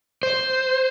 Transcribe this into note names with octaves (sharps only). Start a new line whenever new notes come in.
C5